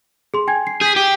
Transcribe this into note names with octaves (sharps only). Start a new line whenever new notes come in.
G#4 C6
G5 G#5 G#6
C7
G#4 G6 B6
G4